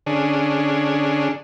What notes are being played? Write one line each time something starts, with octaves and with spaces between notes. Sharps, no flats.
D3 C#4 D4 G#4